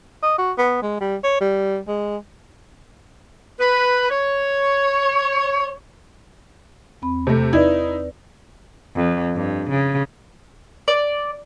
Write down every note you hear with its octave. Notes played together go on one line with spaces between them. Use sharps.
D#5
F#4
B3
G#3
G3
C#5
G3
G#3
B4
C#5
E2 C4 B5
C3 A3
D#4 E4 B4 D5 G#6
F2
G2
C#3
D5